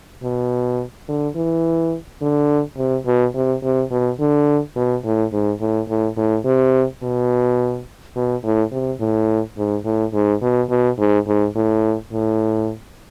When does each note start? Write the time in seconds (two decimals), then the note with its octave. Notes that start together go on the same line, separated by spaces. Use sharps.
0.23 B2
1.08 D3
1.36 E3
2.21 D3
2.77 C3
3.06 B2
3.34 C3
3.63 C3
3.91 B2
4.20 D3
4.76 B2
5.04 A2
5.32 G#2
5.60 A2
5.88 A2
6.17 A2
6.45 C3
7.03 B2
8.16 B2
8.43 A2
8.72 C3
9.00 A2
9.57 G#2
9.85 A2
10.14 G#2
10.42 B2
10.70 B2
10.98 G#2
11.27 G#2
11.55 A2
12.12 A2